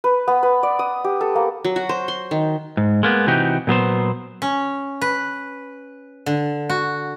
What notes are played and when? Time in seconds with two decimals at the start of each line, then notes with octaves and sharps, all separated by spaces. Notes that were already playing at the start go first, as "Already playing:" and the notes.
0.04 B4
0.28 B3
0.43 B4
0.63 D5
0.79 D#6
1.04 G4
1.21 A4
1.35 A#3
1.65 F#3
1.76 F#4
1.89 C5
2.08 C6
2.31 D#3
2.77 G#2
3.03 G#3 A#3 B3
3.27 C3 E3 D#4 F#4 G4
3.67 A#2 F#3 B3 C5
4.42 C#4
5.01 B4
6.26 D3
6.69 F#4